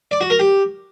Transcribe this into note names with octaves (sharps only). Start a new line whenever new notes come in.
D5
F#4
A#4
G4